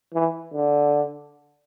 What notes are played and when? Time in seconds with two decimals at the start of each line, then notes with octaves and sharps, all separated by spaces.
0.14 E3
0.54 D3